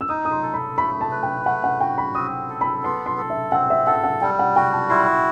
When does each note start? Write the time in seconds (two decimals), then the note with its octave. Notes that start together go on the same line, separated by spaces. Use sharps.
0.01 E6
0.09 D#4 D#6
0.25 D#6
0.31 C6
0.43 A4
0.54 B5
0.77 A3 B5
1.01 A5
1.11 B4
1.23 G5
1.45 A3 F#5
1.64 F#5
1.80 F#4 G5
1.98 B5
2.15 C4 D#6
2.50 A4
2.61 B5
2.83 B3 C6
3.06 C6
3.18 A4
3.30 E5
3.52 C4 F#5
3.70 E5
3.87 A4 F#5
4.04 F#5
4.22 G3 G5
4.39 F#5
4.56 F#4 G5
4.72 A5
4.90 E4 C6